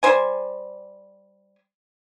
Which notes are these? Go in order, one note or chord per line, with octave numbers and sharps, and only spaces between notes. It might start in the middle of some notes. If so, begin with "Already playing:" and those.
G3 C5 G#5